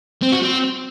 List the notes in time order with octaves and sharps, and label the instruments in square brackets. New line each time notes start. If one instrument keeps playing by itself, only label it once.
[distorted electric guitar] C4
F#4
C4